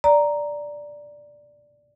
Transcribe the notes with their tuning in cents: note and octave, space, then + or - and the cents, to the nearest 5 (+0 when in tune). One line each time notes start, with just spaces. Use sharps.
D5 +0 A#5 +0